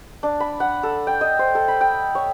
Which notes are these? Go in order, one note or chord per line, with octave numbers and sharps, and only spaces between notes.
D4
B5
F#5
A4
G5
D#5
C5
A4
B5
G5
C#5